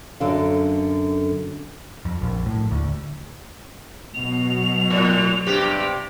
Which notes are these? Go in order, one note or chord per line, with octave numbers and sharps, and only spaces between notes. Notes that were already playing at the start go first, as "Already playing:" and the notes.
F#2 D3 A4 F5
F2
A#1
A2
D2
B2 F#3 F7
A2
G2 C3 G4